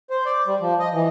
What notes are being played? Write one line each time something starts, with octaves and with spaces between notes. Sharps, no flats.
C5
D5
G3
F3
D#5
E3